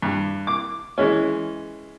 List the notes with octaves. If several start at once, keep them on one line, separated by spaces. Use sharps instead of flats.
G2
D6
E3 G#3 C#4